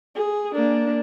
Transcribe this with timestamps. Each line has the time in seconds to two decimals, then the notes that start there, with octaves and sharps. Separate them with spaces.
0.15 G#4
0.54 A#3 D4